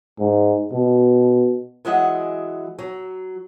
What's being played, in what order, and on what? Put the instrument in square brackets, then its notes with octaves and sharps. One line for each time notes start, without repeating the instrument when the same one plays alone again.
[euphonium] G#2
B2
[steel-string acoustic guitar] E3 F#3 G#3 D#5 E5 F#5
F#3